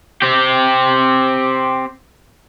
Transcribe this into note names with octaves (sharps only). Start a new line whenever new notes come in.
C4 G4